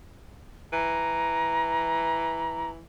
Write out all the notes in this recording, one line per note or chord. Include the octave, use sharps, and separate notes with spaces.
E3 A#5